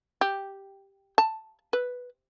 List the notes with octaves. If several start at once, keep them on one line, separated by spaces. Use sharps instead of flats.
G4
A5
B4